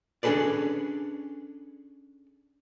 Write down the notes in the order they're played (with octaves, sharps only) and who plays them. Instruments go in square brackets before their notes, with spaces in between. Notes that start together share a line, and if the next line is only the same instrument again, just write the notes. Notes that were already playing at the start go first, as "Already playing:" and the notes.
[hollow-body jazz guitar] C#4 D4 G#4 A4 B4 D5